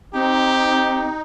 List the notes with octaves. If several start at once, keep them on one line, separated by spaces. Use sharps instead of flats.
C4 D#4 G4